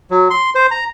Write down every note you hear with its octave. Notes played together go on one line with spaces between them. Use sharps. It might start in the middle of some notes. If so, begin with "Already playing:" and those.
F#3
C6
C5
A#5